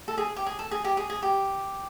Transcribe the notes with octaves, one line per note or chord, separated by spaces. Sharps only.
A4
G#4
G4
G#4
A4
G#4
G4
G#4
G#4
G4